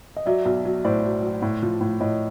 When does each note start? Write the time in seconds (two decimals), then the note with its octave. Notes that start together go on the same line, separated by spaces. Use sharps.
0.17 D#5
0.26 F#3 D5 E5
0.45 B1
0.65 F#3
0.85 A2 C5 D5
1.04 F#3
1.23 F#3
1.42 A2
1.63 F3
1.81 A2
2.00 A2 C#5 D#5